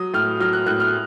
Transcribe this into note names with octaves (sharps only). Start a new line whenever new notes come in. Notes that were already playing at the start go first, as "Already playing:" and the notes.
Already playing: F#3 D#6
A2 F6
F#3 F6
F#6
A2 F#6
F6